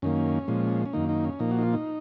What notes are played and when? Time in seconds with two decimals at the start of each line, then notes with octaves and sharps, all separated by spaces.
0.02 F#2 D#3 A#3 C#4
0.48 A#2 F3 G#3
0.86 C#4
0.93 F#2 D#3 A#3 D#4
1.09 D#4
1.24 C#4
1.39 A#2 F3 A#3 D#4
1.51 F#4
1.58 D#4
1.63 F4
1.73 D#4